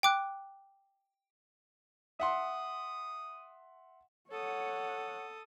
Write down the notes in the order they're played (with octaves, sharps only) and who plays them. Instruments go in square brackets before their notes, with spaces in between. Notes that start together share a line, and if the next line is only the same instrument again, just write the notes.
[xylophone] G5 D6 F#6
[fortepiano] E5 F#5 C6 [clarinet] D#6
[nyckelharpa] A4 D#6 [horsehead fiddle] C#5 F#5